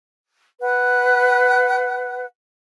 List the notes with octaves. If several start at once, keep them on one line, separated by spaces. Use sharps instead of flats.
B4 F#5